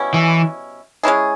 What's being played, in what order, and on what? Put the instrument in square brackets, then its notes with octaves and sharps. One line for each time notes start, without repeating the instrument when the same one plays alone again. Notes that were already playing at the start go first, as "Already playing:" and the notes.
Already playing: [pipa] B2 G3 C#4 E4
[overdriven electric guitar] E3
[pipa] G#3 C#4 E4 G#4